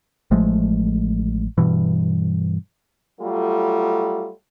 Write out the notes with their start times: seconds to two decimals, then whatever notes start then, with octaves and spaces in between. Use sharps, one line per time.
0.31 A1 F3 G#3 A3
1.58 G2 B2 E3
3.21 F#3 G3 A3 F4 A4